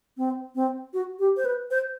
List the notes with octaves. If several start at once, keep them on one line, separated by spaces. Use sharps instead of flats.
C4
C4
F#4
G4
C5
B4
C5